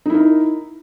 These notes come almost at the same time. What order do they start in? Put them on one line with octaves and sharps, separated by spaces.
D#4 E4 A#4